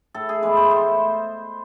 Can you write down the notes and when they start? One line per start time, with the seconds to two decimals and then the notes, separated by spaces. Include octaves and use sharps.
0.14 A2 A4
0.29 G#4
0.42 E3 G#3 B3 B4
0.57 C5
0.71 A2 C5